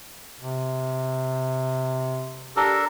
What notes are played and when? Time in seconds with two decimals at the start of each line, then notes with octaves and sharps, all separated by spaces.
0.40 C3
2.56 D4 G4 A4 A#4